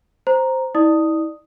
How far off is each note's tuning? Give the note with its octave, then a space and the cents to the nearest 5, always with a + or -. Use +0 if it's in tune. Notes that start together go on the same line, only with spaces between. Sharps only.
C5 +0 A#5 +0
E4 -40 D5 +20 D#6 +0